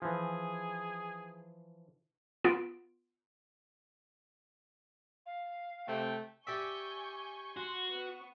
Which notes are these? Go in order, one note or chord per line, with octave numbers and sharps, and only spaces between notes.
E3 F3 G#4
B3 F4 D7
F5
C3 A3 G5
G4 D5 E5 G#5 C#6 G6
F#4 C6
B3 C#6